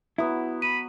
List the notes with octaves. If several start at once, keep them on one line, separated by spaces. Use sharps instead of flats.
F#3 B3 E4
B5 D#7